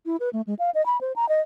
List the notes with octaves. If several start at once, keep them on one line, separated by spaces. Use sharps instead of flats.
E4
B4
A3
G#3
F5
D#5
B5
C5
A#5
D#5